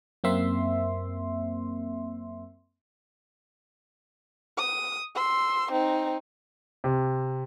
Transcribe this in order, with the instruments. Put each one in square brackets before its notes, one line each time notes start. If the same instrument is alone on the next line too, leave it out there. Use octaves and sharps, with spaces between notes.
[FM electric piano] F#2 A#3 C4 E5 C6
[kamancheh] D#6
C6 E6
C4 D#4
[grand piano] C3